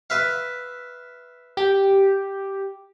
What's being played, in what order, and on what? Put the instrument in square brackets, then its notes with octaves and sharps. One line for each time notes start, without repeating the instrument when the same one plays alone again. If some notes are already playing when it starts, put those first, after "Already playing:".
[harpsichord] B4 E5 F5
[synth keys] G4